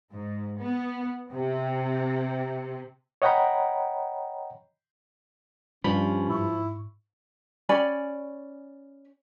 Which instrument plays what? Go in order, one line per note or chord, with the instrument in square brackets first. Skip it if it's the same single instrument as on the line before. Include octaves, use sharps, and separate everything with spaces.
[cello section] G#2
B3
C3
[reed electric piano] C#5 D#5 F#5 G5 A#5 B5
[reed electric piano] G2 B5 [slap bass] F3 [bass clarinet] C#4
[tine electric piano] G#2 C#6 [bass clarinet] E4
[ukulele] C#4 D5 G#5 B5